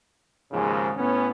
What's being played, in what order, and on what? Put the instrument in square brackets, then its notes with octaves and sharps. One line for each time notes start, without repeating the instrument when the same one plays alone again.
[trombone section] D#2 G#2 C#3 F3
A2 B3 C#4